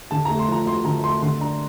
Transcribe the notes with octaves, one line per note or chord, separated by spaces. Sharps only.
D3 A5
A3 A#5
C6
F3 A#5
D2 C6
D3 A#5
A3 C6
D3 C6
D4 A#5